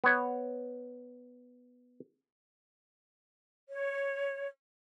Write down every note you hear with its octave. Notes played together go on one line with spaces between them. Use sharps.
B3 C#5
C#5